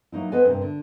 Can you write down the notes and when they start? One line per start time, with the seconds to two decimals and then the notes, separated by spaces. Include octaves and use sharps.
0.12 F#3 A#3 D#4 E4
0.32 B3 A4 B4 C5 D#5 G#5
0.45 G2 C3 A3 A#3 C4
0.61 D3